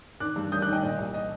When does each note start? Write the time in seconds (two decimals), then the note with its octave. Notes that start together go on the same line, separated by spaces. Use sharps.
0.20 D#3 D6 F#6
0.36 G2
0.52 G2 D#6 G6
0.62 D6 F#6
0.68 D#3 D#5 G5
0.83 A#2 D#5
0.99 C2
1.14 D#5